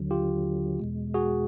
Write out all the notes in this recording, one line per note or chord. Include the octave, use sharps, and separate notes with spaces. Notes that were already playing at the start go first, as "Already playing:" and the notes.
Already playing: D#2 D3 F#3
F4 G4
E2 B2 G#3
F#4 G#4